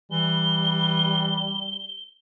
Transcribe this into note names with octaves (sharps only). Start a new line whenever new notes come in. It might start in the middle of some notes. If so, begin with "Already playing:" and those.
E3 G3 G7